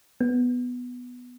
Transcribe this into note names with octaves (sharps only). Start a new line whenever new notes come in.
B3